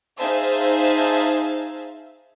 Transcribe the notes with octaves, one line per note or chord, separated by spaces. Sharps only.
D#4 G#4 C5 E5 F5 A5